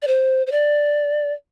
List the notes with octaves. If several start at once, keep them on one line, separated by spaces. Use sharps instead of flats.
D5
C5
C5
D5